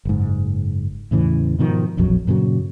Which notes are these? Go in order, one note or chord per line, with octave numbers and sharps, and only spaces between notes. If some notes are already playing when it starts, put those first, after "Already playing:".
F#1 G#2
E2 A2 C#3 E3
G#2 B2 D#3 F3
E1 A#1 F2 F#3
G2 A#2 C#3 F#3